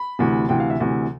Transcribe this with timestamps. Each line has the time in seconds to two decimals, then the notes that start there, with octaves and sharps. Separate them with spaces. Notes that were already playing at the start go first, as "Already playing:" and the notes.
Already playing: B5
0.19 D2 C3 E3
0.49 D2 C3 E3 G5
0.60 F5
0.70 E5
0.80 D2 C3 E3